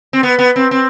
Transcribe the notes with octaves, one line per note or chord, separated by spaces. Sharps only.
C4
B3
B3
C4
C4